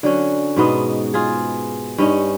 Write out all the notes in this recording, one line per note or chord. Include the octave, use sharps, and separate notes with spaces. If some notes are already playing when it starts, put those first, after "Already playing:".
D3 F#3 C#4
G#2 B2 B3 D#5
F4 G#4
G2 C#4 D#4